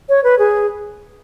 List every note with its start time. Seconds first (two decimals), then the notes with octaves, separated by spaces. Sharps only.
0.09 C#5
0.24 B4
0.39 G#4